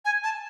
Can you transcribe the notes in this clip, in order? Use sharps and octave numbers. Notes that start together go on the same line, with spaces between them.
G#5
A5